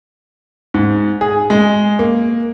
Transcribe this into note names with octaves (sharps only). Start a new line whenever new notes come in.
G#2
G#4
G#3
A#3